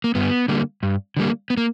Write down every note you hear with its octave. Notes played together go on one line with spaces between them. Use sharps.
A#3
G2 B3
D3 G3 A#3
G2
D3 G3 A#3
B3
A#3